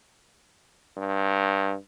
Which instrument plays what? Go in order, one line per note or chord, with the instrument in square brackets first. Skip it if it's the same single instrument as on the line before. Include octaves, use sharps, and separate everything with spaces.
[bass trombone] G2